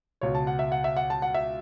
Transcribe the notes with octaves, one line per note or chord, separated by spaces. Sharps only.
C#2 B2 C#5
A5
F#5
E5
F#5
E5
F#5
A5
F#5
E5